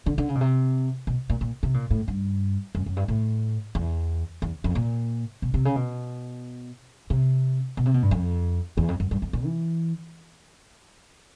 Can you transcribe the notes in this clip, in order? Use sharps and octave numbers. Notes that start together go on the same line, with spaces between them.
D3
D3
C#3
B2
C3
B2
A#2
A#2
C3
A#2
A2
G2
F#2
F#2
G2
A2
E2
E2
F2
A#2
B2
C3
C#3
B2
C3
B2
C3
B2
G2
F2
E2
F2
F#2
G2
F2
A#2
E3